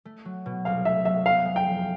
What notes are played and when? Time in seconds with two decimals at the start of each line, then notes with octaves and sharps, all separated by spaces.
0.05 A3
0.25 F#3
0.46 B2
0.65 C2 F5
0.85 A3 E5
1.05 F#3 E5
1.26 B3 F5
1.45 G#3
1.56 G5
1.66 F3